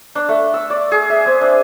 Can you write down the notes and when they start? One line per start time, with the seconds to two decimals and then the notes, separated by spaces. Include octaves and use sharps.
0.15 D4
0.29 A3
0.54 E6
0.70 D5
0.92 G#4
1.10 E5
1.26 C4
1.41 D4